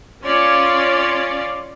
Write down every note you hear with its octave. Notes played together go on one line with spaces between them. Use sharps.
C#4 F4 C#5 D5 C6